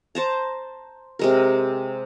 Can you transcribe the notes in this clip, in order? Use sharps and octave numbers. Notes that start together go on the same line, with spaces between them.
C5 A5 A#5
C3 G#3 A#4